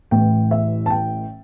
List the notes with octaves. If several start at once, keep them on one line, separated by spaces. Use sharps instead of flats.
A1 A2 E3 G5
E5
A5
G5